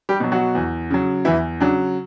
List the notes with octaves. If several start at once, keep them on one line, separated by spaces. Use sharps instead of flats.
G3 G4
B2 F#3
F#3 F#4
E2
C#3 F#3
E2 E3 E4
C#3 F#3 D4